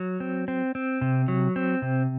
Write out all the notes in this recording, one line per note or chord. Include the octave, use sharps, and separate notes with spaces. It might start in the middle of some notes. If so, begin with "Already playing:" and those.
Already playing: F#3
C4
C4
C4
C3
F#3
C4
C3